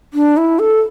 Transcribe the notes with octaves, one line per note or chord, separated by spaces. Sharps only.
D4
E4
A4